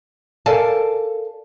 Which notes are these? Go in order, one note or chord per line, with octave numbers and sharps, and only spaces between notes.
A4 A#4 D5 F5 G#5 A5